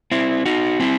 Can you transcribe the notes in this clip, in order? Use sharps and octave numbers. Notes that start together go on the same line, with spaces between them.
C4 E4
D#4 F#4
C4 E4